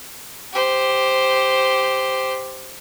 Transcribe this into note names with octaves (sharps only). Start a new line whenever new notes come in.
G4 C5